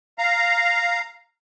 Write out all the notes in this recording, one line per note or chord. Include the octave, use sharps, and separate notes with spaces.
F5 A#5